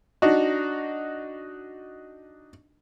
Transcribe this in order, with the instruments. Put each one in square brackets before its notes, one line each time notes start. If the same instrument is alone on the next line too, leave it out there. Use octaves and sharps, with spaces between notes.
[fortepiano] D4 D#4 F#4